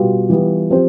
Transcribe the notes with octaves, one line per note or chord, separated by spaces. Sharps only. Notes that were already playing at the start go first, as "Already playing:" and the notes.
Already playing: B2 G3 B3 F4
E3 G3 B3 F4
F3 C4 G4 C5